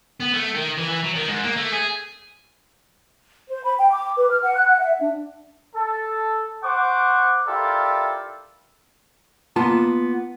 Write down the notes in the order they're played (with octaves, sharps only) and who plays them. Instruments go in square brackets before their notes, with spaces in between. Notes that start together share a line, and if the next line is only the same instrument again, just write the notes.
[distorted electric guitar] B3
A3
D#3
E3
E3
F#3
D#3
G#2
A#3
A3
G#4
[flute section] C5
B5
G5
D6
B4
F6
F#5
F#6
F#5
E5
D4
[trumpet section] A4
C5 F#5 C#6 D6
E4 F4 G4 A4 A#4 D5
[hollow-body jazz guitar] A#3 B3 F4 A5